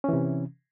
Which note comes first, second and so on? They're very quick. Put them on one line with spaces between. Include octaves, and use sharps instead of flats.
C#4 E3 C3